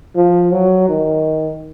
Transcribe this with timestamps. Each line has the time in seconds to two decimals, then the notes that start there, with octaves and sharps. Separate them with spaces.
0.16 F3
0.52 F#3
0.89 D#3